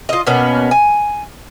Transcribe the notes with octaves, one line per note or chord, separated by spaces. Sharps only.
F4 D#5
B2 A#3 B3 C#4
G#5